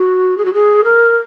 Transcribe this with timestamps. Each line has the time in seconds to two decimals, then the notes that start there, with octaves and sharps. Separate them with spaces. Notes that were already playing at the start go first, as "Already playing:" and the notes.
Already playing: F#4
0.38 G#4
0.45 F#4
0.54 G#4
0.84 A#4